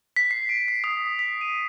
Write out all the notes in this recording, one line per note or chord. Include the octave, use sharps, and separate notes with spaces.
B6
C7
D7
C7
D#6
B6
D#7